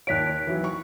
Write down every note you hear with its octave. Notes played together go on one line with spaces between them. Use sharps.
D#2 C#5 F#6 B6 D7
E3 F#3
C#6